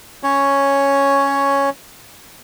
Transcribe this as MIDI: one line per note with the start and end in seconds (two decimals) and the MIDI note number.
0.23 1.70 61
0.23 1.70 73